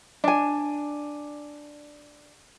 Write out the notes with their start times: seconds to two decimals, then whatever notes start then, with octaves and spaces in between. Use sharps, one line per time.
0.24 D4 G#5